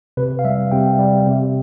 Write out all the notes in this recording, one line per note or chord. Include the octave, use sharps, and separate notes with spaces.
C3 B4
F5
G3 E5
C3 G5
G3
C3